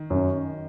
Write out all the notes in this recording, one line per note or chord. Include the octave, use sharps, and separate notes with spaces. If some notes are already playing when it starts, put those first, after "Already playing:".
Already playing: D#3
F#2